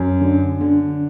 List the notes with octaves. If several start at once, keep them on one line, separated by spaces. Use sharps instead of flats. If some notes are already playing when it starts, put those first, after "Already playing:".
Already playing: F#2
D3
D3